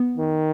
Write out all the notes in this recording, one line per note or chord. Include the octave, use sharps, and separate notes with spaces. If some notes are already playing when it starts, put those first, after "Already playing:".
Already playing: B3
D#3